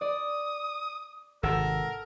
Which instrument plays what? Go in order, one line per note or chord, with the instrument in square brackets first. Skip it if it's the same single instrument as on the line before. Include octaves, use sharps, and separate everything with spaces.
[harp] D5 [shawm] D#6
[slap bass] G#1 C3 [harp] A4 [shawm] A#4 [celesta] F#5 E6